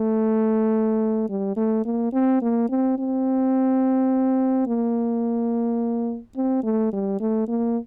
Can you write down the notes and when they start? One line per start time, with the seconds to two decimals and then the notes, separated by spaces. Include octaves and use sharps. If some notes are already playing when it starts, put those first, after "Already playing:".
Already playing: A3
1.29 G3
1.57 A3
1.86 A#3
2.13 C4
2.42 A#3
2.69 C4
2.98 C4
4.67 A#3
6.36 C4
6.64 A3
6.93 G3
7.20 A3
7.48 A#3